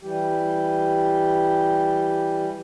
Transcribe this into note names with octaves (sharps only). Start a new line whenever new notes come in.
E3 G3 G4